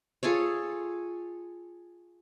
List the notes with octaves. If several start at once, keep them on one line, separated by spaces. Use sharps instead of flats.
F4 G#4 A4 C#5